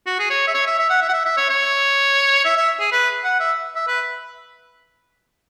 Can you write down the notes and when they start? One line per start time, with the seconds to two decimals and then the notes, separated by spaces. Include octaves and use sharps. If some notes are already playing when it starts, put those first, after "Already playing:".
0.06 F#4
0.19 G#4
0.30 C#5
0.47 E5
0.54 C#5
0.67 E5
0.78 E5
0.90 F#5
1.01 E5
1.09 F#5
1.13 E5
1.25 E5
1.37 C#5
1.49 C#5
2.45 E5
2.56 E5
2.80 G#4
2.92 B4
3.24 F#5
3.39 E5
3.75 E5
3.87 B4